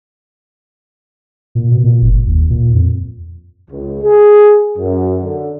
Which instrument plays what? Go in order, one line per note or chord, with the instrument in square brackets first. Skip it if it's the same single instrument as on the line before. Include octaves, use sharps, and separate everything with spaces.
[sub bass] A#2
B2
A#2
F#1
D#2
A#2
F2
[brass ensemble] C#2
G#4
F#2
D3